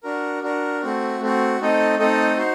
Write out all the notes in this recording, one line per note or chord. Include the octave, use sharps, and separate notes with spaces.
D4 F#4 A#4
D4 F#4 A#4
A3 C4 F#4
A3 C4 F#4
A3 C4 D#4 A4 D#5
A3 C4 D#4 A4 D#5
D#4 F#4 C5